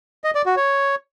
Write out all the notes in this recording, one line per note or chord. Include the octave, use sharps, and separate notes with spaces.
D#5
D5
F#4
C#5